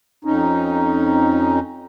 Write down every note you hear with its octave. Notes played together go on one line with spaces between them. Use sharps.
F2 C#4 D#4